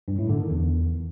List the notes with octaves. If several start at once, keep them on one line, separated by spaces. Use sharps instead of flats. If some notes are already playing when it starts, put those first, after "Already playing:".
G2
A2
D3
D#3
E2